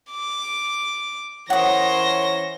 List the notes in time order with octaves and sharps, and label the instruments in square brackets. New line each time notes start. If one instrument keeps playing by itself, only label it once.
[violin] D6
[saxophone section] E3 C#4 C#5 [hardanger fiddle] A#4 C5 [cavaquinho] F#5 D#6 [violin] A#6